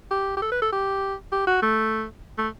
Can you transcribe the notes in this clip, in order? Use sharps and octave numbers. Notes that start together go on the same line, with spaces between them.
G4
G4
A4
B4
A4
G4
G4
F#4
A3
A3